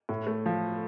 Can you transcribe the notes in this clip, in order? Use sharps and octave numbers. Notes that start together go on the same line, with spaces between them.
A2
A3
F3